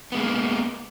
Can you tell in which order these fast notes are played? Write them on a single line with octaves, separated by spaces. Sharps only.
B3 G#3 A#3